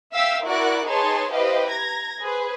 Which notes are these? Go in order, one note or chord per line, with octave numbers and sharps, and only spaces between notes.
E5 F5 G5 E6 B6
E4 F#4 A#4 D5 F#5 F#6
D#4 G#4 B4 C#5 A5 C6
E4 G4 B4 C5 D#5 F5
A#5 G#6 A#6
G#4 B4 C5